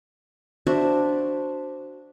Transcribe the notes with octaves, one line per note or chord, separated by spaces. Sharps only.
D4 F#4 C5 E5